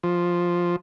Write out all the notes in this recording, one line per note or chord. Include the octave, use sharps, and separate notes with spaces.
F3